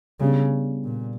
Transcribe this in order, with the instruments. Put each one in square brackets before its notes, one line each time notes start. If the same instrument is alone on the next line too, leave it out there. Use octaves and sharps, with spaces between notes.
[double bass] C#3 [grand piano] G3 B3 D4 G4
[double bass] A#2